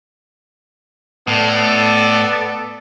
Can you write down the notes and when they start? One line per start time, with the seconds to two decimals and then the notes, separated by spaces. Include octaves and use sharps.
1.27 A2 B3 A4 D5